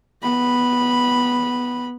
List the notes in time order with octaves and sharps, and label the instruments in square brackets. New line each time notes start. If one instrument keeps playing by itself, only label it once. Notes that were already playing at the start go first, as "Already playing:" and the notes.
[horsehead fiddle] B3 B5